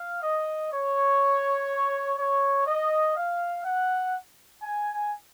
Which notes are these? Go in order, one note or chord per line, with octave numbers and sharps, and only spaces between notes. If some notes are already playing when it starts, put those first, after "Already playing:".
Already playing: F5
D#5
C#5
C#5
D#5
F5
F#5
G#5